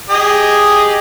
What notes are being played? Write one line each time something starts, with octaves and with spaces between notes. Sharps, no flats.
G4 G#4 D#5